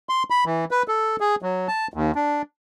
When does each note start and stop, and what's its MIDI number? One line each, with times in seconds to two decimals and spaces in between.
0.09 0.23 84
0.30 0.44 83
0.46 0.65 52
0.71 0.83 71
0.88 1.16 69
1.20 1.35 68
1.42 1.68 54
1.68 1.88 81
1.94 2.12 39
2.15 2.42 62